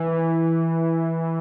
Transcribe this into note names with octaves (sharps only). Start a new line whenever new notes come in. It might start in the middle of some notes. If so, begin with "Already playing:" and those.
Already playing: E3